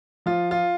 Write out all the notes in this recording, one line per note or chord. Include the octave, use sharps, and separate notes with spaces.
F3 F4
F4